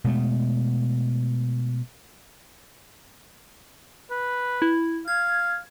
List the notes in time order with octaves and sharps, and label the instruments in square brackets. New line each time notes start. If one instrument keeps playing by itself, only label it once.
[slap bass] B2 G#3 A3
[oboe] B4
[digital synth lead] E4
[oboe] F5 [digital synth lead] G#6